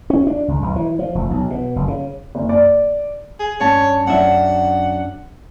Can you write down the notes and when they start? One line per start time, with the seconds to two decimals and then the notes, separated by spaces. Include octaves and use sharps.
0.10 C#4
0.27 D4
0.48 C#2
0.62 B1
0.76 E3
0.99 F3
1.15 F1
1.31 B1
1.50 B2
1.76 F#1
1.88 C#3
2.35 F#1
2.49 D5
3.39 G#4
3.60 G2 C#4 C#5 A5
4.07 F#2 D4 E5 F#5